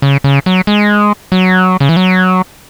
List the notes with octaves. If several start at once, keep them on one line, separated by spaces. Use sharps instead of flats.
C#3
C#3
F#3
G#3
F#3
C#3
E3
F#3